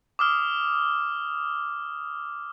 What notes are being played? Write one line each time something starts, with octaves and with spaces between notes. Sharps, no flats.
D6 D#6 F6